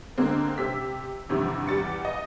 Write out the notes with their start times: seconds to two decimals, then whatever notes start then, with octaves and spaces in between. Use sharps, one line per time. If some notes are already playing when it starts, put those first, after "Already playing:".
0.18 D3 G#3 A#3 C4
0.58 C3 G4 E6 B6
1.29 E2 G2 C3 D#3 F3
1.68 E2 G3 D6 A6 C#7
2.05 D#5